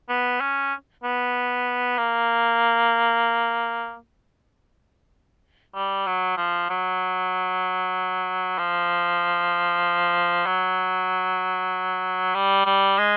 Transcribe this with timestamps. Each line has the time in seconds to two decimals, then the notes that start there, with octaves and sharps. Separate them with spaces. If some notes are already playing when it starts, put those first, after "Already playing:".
0.09 B3
0.41 C#4
1.04 B3
1.98 A#3
5.75 G3
6.07 F#3
6.37 F3
6.70 F#3
8.58 F3
10.46 F#3
12.35 G3
12.66 G3
12.98 G#3